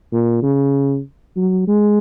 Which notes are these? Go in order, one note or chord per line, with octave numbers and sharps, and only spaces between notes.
A#2
C#3
F#3
G#3